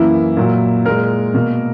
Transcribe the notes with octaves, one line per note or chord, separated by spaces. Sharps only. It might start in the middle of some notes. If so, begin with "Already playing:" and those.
Already playing: F#2 E3 A#3 E4
A#2 F#3 A#3
A#2 G#3 A#4
B2 A#3